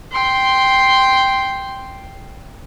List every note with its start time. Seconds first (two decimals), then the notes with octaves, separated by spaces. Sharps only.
0.12 G5 C6